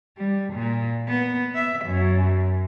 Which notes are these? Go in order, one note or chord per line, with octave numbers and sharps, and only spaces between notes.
G3
A#2
B3
E5
F#2